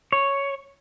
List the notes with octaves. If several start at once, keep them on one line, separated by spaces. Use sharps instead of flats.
C#5